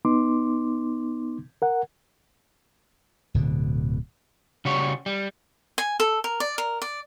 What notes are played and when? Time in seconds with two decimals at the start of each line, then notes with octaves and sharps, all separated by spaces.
0.05 B3 D#4 C6 D6
1.62 A#4 F#5
3.34 D1 B2 D3
4.65 C#3 G3 F#4 C#5
5.06 G3
5.78 G#5
6.00 A4
6.24 A#4
6.40 D5
6.58 A#4
6.82 D5